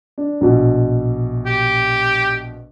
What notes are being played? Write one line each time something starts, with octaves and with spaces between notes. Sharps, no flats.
D4
A#1 B2
G4